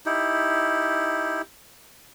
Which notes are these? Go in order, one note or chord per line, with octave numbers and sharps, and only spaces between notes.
D#4 E4 G4